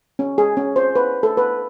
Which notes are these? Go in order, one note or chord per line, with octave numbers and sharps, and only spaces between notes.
C#4
G#4
C#4
C5
B4
A4
B4